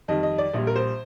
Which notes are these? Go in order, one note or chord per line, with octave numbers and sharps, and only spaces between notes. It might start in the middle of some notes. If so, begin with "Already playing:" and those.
F2 D#3 G3 D#5
D#5
D5
A#1 A#2 G3
A#4
C5